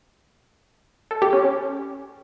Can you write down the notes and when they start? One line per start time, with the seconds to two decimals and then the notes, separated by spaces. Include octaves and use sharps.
1.11 A4
1.22 G4
1.33 C#4
1.44 C#4